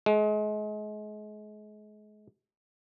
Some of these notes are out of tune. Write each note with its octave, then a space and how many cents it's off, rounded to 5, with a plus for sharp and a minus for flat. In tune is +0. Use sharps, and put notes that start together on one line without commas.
G#3 +35